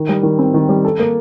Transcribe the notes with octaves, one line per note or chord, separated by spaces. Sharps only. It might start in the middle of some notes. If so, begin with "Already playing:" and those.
Already playing: D#3
G3
D#3
C4
D#3
G3
A4
A#3